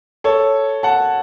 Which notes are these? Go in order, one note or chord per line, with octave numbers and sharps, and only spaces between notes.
A4 C#5
F#5 A5